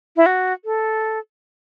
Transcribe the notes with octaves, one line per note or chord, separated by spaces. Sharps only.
E4
F#4
A4